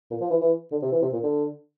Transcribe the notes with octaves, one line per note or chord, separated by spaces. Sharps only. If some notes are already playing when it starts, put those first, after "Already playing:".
A#2
F3
E3
E3
D3
C3
E3
C3
A#2
D3